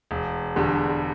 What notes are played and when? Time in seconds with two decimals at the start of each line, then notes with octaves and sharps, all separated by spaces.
0.11 E1
0.56 E2 D3 G3